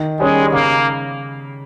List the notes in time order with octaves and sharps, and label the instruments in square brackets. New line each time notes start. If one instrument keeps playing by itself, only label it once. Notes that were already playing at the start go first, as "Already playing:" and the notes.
Already playing: [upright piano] D#3
[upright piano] G3 C#4 G#4 [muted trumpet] G#3
[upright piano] C#3 [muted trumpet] A#3